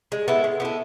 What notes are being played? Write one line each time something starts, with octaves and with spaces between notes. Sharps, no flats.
G#3
B3 E4 A4
G#3
B3 E4 A4